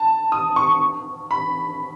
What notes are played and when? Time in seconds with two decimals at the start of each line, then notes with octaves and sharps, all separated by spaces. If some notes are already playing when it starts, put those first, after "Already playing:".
Already playing: A5
0.32 D#6
0.56 C#6
1.31 B5